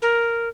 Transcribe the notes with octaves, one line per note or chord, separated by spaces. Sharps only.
A#4